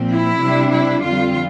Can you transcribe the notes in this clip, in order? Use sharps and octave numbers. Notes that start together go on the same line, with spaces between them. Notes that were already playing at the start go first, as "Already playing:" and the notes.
Already playing: A#2 F3 C4
E4
C3 G3 D4
E4
F2 D3 G3 C4 F4